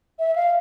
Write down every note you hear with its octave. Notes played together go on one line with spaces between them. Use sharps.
E5
F5